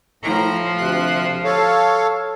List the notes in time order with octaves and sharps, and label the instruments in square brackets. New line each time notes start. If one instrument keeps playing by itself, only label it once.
[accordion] A2 A#5 [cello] F3
[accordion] D2 C3 F#6
A4 C#5 F5